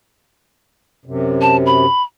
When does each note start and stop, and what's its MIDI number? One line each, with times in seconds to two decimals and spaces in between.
1.06 1.86 42
1.06 1.86 48
1.42 1.57 81
1.66 2.02 83